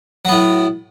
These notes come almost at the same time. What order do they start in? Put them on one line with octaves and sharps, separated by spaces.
F#3 B3 A2